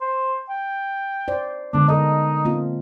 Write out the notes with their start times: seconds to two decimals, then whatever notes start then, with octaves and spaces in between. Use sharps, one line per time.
0.01 C5
0.49 G5
1.28 C5 D5
1.73 D3 G#3 B3 D4
1.88 D#4 A4 A#4 D#5
2.45 A#3 C4 F4